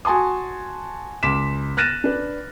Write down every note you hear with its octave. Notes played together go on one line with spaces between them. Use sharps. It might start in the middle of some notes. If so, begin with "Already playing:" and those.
F#4 G#5 A5 C6 D#6
C#2 C6 D6 B6 E7
F6 F#6 A6 A#6 D#7 E7
D4 B4